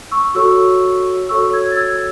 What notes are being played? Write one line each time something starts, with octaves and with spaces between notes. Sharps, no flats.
C#6 E6
F#4 A4 C#5 C#6 E6
F#4 A4 C#5 C#6 E6
E6 G#6
A6
E6 G#6